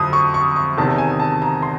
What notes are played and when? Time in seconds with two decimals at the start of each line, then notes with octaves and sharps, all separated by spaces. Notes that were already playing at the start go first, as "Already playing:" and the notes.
Already playing: F2 D3 F#3 D#6
0.13 C#6
0.34 C#6
0.56 C#6
0.77 E2 C3 D#3 A5
0.98 G#5
1.20 A5
1.42 A#5
1.62 C6